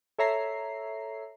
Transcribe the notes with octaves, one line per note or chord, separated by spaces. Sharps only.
A4 C#5 E5 A#5 C7